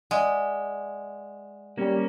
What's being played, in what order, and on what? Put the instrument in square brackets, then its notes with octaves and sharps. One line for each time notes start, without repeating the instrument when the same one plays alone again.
[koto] G#3 [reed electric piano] D5 E5 F#5
[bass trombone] G3 [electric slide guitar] A#3 C#4